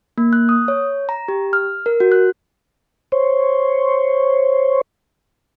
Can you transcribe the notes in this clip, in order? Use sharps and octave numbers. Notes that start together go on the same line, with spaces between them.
A#3
F#6
D#6
C#5
A#5
G4
F6
A#4
F#4
F#6
C5 C#5